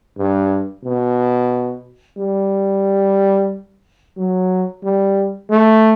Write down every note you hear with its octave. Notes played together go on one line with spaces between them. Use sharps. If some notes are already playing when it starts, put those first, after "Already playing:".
G2
B2
G3
F#3
G3
A3